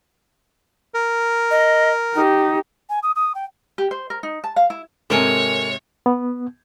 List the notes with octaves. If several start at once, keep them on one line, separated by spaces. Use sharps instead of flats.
A#4
D#5
D#4 G4
G#5
D#6
D#6
G5
G4
C5
A#4
D#4
A5
F5
E4
G#2 C3 A4 A#4 C#5 G#5
B3